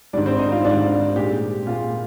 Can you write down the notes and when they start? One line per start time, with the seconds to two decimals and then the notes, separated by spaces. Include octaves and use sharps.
0.13 G#2 D#3 G3 D4 D5
0.26 C4 C5
0.39 D#4 D#5
0.52 F4 F5
0.64 G#2 D#3 G3 D4 D5
1.16 A#2 G#3 G4
1.67 A#2 G#3 F4